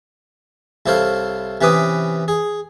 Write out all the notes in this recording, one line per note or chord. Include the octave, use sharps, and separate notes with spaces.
C2 E4 A4 C5 C#5 F5
C3 E3 C#4 B4 D6 D#6
G#4